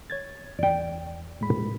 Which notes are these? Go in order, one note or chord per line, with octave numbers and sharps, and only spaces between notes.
C#5 G#6 A6
E2 D5 G5
A2 G#3 B5